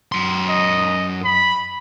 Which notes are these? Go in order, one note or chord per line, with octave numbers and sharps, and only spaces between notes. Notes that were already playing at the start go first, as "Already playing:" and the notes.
F#2 C6
D#5
B5